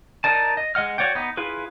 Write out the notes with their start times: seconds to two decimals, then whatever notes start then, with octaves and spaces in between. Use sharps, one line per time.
0.24 D#4 A#4 D5 A5
0.57 D#5
0.75 G#3 D#5 F#5 F6
0.98 F#4 C#5 D5 F#5 G5
1.15 B3 D#4
1.37 E4 F4 G#4 B4